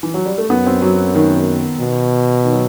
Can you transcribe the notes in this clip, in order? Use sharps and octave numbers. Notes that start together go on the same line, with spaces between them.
E3
F#3
G3
A3
F#2 B3
C4
F#3
D#3
B2
D#3
F#3